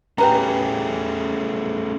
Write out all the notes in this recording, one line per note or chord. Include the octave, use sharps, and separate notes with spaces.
A3 C#4 G4 G#4 B4 A#5